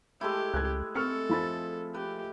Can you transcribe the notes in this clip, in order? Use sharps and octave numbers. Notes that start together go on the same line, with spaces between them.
G#3 A3 E4 G4
C#2 F#6 G#6
C4 A4 C#6 F6 C#7
F3 B5 A6
G4 B4